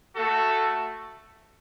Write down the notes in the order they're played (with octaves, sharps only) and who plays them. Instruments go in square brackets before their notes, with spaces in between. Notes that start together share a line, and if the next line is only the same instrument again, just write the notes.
[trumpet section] A3 F#4 A4